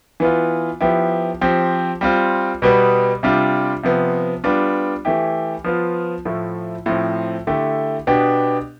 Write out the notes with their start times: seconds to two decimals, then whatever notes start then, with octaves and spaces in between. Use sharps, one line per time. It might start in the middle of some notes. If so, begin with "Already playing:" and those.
0.20 E3 B3 F4
0.81 F3 B3 E4 G4
1.41 F3 C4 G4
2.01 G3 C4 F4
2.62 B2 G3 B3
3.23 C3 G3 D4 F4
3.83 C3 F3 B3
4.44 G3 B3 D4 F4
5.05 E3 A3 E4 G4
5.64 F3 B3 F4
6.25 A2 F3 A3 E4
6.86 A2 F3 C4
7.47 D3 A3 E4 G4
8.07 B2 B3 D4 G4